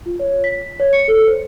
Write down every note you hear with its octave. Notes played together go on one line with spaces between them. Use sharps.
F4
C#5
B6
C#5
C#7
A4
C5